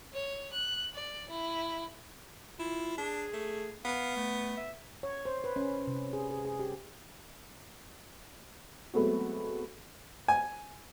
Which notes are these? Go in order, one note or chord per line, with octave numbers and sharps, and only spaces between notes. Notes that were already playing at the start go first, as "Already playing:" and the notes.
C#5
F#6
D5
E4
E4 F4
D4 G#4
A3
B3 F5
A3
E5
C#5
C5
B4
C#4
C3
G#4
G#4
G#4
G4
F#3 G#3 A3 B3 C4 F#4
G#5